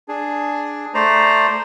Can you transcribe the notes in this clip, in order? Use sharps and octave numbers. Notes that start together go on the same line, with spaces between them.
D4 G#4
A3 C5 D5 A#5